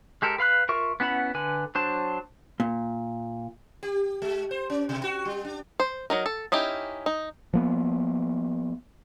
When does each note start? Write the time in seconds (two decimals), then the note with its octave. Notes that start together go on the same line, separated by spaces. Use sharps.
0.22 G#3 G4 A4 A#4
0.38 B4 F5 B5 F#6
0.69 F4 A#4 E5 C#6
1.00 B3 C#4 E4 F#5 B5
1.35 D3 B4 G#5
1.75 F#3 D4 C5 A5
2.60 A#2
3.83 G4
4.22 G#3
4.51 C5
4.70 C#4
4.89 B2
5.04 F#4
5.25 G3
5.45 D4
5.80 C5
6.10 F#3 D#4 A#4
6.26 A4
6.52 C#4 D#4 E4 G4
7.06 D#4
7.54 F3 A#3 B3